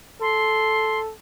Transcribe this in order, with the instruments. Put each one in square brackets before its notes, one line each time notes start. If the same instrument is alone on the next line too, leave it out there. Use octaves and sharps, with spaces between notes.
[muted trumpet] A4 [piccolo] C6